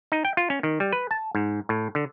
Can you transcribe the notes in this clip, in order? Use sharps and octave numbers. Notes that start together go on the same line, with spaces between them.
D#4
G5
F4
C#4
D#3
G3
B4
A5
G#2
A2
D3